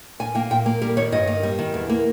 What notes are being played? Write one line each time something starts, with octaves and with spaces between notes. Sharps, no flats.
A#2 G#5
A#3 G5
A#2 G5
A#3
G3 A#4
D#3 C#5
G2 D#5
A#3
G3
D#3
E2
A#3